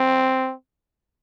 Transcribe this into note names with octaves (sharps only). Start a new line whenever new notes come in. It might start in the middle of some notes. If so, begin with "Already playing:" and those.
Already playing: C4